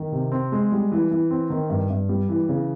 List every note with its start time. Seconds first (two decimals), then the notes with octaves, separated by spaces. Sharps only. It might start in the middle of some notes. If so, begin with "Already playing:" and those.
Already playing: D#3
0.12 C3
0.32 C4
0.52 G#3
0.72 G3
0.92 E3
1.11 E3
1.31 C4
1.50 D#3
1.70 G2
1.90 G2
2.09 G3
2.29 E3
2.49 C#3